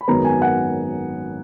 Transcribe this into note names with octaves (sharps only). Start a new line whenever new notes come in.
B5
G#1 F#2 D#3 G#3 B3 A#5
G#5
F#5